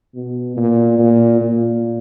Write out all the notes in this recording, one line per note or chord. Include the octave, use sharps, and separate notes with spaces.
B2
A#2
A#2
A#2